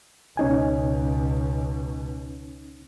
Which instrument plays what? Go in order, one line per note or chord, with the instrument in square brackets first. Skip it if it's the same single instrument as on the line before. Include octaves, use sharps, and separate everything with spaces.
[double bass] C#2 B2 [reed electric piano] C#4 D#4 G#5